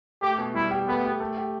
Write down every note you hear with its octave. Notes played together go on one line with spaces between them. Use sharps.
A3 G4
B2
G3 E4
G4
A3 B3
G4
A3
G4